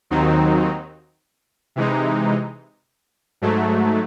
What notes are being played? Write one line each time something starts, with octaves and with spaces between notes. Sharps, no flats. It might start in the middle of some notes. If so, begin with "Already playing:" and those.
D#2 D#3 F#3 C4 D#4
C3 E3 G#3 D#4
G#2 F#3 A3